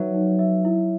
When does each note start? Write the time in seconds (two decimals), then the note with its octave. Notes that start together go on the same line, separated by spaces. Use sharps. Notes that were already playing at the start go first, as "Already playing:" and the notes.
Already playing: F#3 D#4 F#4 B4 E5
0.14 D#4
0.39 E5
0.65 E4